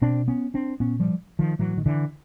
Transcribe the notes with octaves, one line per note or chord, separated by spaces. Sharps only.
B2 C4 D4
B3 C#4
C4 D4
A#2 B3 C#4
F3 G3
D#3 F3
A2 E3 F#3
D#3
D3 E3